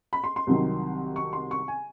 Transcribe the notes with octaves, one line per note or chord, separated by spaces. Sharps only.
B5
C6
C6
C2 C3 D#3 F#3
C#6
C6
C#6
G#5